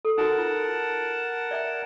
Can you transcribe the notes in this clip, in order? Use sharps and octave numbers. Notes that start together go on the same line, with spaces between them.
A4
D#4 F#4 A#4 F#5 A5
F4
D5 E5 G5